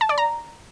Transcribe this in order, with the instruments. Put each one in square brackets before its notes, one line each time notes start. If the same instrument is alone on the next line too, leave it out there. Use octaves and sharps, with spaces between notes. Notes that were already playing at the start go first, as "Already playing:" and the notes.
[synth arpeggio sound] A5
D5
A#5